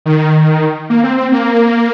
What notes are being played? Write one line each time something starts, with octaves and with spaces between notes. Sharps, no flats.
D#3
A#3
C4
C4
A#3